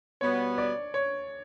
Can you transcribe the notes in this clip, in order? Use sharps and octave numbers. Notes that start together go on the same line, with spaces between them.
B2 G3 B3 C#5
D5
C#5